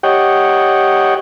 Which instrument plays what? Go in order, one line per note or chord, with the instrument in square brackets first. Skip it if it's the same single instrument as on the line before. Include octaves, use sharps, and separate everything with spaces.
[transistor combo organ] G4 C#5 D#5 F#5 G5